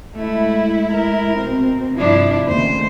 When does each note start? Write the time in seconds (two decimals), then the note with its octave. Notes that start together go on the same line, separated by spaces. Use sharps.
0.15 G#3 A3 E4
0.91 A#4
1.41 B2 C4
1.96 G2 C3 F3 D4 E4
2.49 D#2 C#3 A3 C5